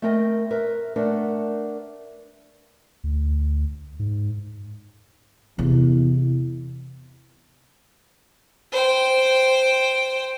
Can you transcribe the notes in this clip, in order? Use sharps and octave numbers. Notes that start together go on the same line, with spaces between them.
A3 C4 A#4 D#5 G5
A#4 B4 E5
A3 D4 A#4 B4 D5 F#5
D2
G#2
E2 C3
C5 G5